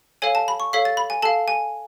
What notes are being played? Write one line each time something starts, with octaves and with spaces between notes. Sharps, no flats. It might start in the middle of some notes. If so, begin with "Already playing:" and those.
A4 C#5 F5 G#5
A5
B5
C#6
A4 C#5 F5 B6
A6
B5
G#5
A4 F5 A5
G#5